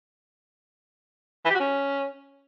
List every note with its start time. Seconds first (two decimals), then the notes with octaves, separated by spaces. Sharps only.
1.45 E3
1.50 G4
1.55 F#4
1.60 C#4